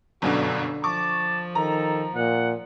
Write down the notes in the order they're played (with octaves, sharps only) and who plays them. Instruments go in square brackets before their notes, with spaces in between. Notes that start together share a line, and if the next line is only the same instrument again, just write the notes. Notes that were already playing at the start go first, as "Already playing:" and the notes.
[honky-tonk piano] G1 F#2 B2 [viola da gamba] D3 [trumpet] F#4
[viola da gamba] F3 [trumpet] A5 [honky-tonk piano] C#6 D6
[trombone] D#3 [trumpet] A4 [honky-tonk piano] A#5
[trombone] A#2 [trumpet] F#5